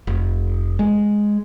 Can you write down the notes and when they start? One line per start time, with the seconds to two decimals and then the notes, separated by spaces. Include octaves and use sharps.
0.07 F1
0.79 G#3